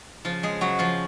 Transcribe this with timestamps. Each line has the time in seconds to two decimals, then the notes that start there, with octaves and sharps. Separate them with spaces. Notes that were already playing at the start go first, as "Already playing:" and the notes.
0.25 C#3 F3 F4
0.43 G#3 G#4
0.61 C#3 F#3 F#4
0.79 F3 F4